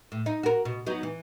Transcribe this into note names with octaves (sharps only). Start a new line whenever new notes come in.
A2
D#4
F#4 A#4
B2
F#3 B3 D#4
E3